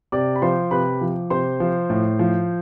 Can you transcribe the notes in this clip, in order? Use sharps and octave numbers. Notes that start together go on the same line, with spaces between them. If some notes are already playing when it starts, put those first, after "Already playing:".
C3 D5 D6
B5
F3 C5 C6
C3 B4 B5
F3
C3 C5 C6
F3
A2
F3